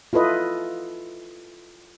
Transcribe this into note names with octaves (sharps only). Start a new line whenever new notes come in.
E4 F4 A4 B4 D#5